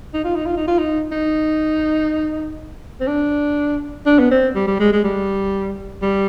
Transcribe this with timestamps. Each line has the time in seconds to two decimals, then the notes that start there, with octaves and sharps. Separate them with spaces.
0.14 D#4
0.24 F4
0.36 D#4
0.46 F4
0.57 D#4
0.68 F4
0.78 D#4
1.12 D#4
3.00 C4
3.08 D4
4.06 D4
4.19 B3
4.31 C4
4.55 G3
4.67 G3
4.80 G#3
4.92 G#3
5.04 G3
6.02 G3